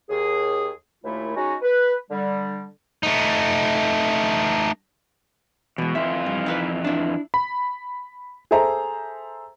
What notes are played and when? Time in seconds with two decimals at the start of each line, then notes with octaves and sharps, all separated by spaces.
0.10 D#2 G#4
1.04 D#2 A#2 A3 E4
1.36 G#3 C#4 D#4 F#4
1.62 B4
2.11 D3 G3
3.03 A3 D#4
5.78 B2 E3 G#3
5.95 F2 E3 F4 E5
6.26 G2
6.46 D#4 E4 B4
6.84 D4 E4
7.34 B5
8.51 G#4 A4 C5 E5 A#5